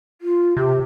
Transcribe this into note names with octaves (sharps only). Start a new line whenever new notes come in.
F4
C3 G4